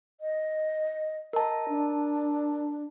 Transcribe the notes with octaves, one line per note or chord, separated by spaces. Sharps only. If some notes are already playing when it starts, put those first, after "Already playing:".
D#5
A#4 D#5 A5
D4